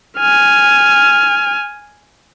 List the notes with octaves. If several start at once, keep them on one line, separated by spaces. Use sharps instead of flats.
G#5 F6